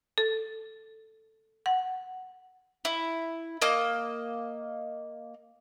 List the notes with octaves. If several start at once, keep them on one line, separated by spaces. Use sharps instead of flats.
A4
F#5
E4
A#3 D#5